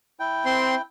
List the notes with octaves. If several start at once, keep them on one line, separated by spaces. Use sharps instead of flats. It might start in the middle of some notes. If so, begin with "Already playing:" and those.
E4 G5
C4 C6